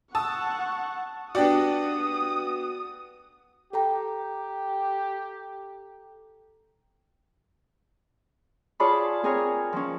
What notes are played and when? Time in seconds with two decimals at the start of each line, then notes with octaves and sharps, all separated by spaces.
0.15 F#5 A5 C#6 D#6 E6
1.35 B3 D4 F#4 G4 D5 D#6
3.73 G4 A4 G5 A#5
8.80 F4 G#4 C#5 D5 A5 B5
9.23 C4 G#4 A#4 C#5
9.73 F3 C#4